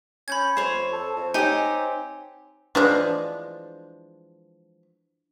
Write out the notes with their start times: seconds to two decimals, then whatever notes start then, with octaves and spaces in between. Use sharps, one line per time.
0.28 C#4 B5 G6 G#6
0.57 F2 C5 C#5
0.93 A4
1.16 F2
1.34 C4 D#4 G4 C#5 G#5
2.75 E3 F3 G#3 D4